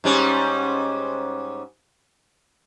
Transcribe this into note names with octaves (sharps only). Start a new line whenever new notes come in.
G#2 G3 C#4